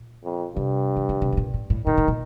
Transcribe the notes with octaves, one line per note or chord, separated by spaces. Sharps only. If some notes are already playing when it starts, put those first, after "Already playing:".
Already playing: A#2
F2
G2 C3
D#3
D3
C3
C3
A#2
A2
A2
A#2 D#3
A2
A#2